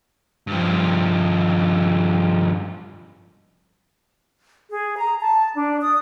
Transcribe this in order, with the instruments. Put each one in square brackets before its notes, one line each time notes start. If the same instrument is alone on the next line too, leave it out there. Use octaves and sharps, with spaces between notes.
[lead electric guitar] G2 F3
[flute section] G#4
A#5
A5
D4
D#6